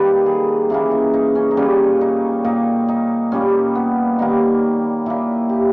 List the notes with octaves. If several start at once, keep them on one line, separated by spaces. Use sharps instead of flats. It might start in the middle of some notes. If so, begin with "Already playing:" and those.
Already playing: D#3 G3 A#3 B4
G#4
C#3 E3 A#3 E4
D#4
D#4
C#4
D#4
A#2 G3 A#3 C#4
D#4
A#2 A#3 D#4
D#4
A#2 G3 A#3 C#4
B3
D#3 G3 A#3 D#4
A#2 A#3 E4
G4